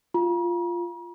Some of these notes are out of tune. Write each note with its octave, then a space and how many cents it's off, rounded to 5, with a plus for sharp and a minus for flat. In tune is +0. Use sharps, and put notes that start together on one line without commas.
F4 -5 A#5 +45